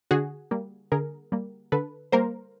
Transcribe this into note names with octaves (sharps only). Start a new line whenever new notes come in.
D3 F#4 G#4
G3 A#3
D3 G#4 A#4
G3 A#3
D3 A4 B4
G3 A#3 A#4 C5